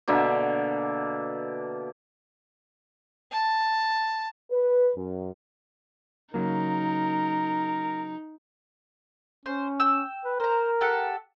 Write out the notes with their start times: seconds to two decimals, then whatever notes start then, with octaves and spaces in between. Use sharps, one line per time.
0.08 B2 D3 A#3 E5
3.31 A5
4.51 B4
4.95 F#2
6.34 C#3 F#3 A#3 D#4 A#4
9.46 C#4 C5
9.80 G5 E6
10.25 B4
10.40 A#4 C5 A#5
10.81 G4 A4 F#5